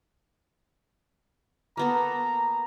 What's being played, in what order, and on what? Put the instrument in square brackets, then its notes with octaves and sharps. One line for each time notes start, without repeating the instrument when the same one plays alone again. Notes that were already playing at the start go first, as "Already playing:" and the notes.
[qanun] A#3 B3 A4 [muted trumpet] A#5